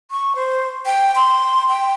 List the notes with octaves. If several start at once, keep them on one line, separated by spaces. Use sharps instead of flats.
C#6
C5
G5
C6
G5